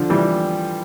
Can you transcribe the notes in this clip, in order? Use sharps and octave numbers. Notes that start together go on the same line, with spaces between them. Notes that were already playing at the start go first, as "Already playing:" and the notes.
Already playing: D3 F3
E3 G3